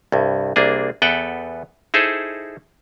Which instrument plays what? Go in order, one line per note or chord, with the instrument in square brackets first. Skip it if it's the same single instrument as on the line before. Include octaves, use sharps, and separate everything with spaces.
[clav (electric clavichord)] C2 G2
C2 A#3 D4 G#4
E2 B3 A4 B4 F#5 G5
D#4 E4 G#4 A4 C5